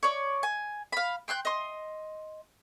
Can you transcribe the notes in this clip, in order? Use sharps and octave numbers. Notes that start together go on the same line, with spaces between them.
C#5 D5
G#5
F5 B5
G5 C6 F#6 G6
D#5 C6